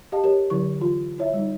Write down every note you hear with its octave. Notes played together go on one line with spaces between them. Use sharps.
G4 D#5 F5 A5
G4 A#4 C#5
D3 F#3 E4 C#6
E3 F4
E4 C#5 E5
G3 D#4